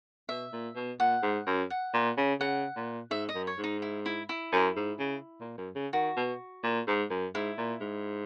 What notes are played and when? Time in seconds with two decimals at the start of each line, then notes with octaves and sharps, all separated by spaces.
0.29 B2 E5
0.53 A#2
0.76 B2
1.00 A#2 F#5
1.23 G#2
1.47 F#2
1.70 F#5
1.94 A#2
2.18 C#3
2.40 C#3 F#5
2.76 A#2
3.11 G#2 E5
3.29 D#5
3.35 F#2
3.47 C#5
3.58 G#2
3.64 D#4
3.82 E4
4.06 E4
4.29 E4
4.52 F#2
4.76 G#2
5.00 C#3
5.41 A#2
5.58 F#2
5.75 C#3
5.93 D#3 F#4
6.17 B2
6.64 A#2
6.88 G#2
7.10 F#2
7.35 G#2 E4
7.58 A#2
7.81 G#2